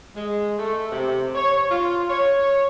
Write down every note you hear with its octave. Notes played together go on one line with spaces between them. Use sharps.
G#3
A3
C3
C#5
F4
C#5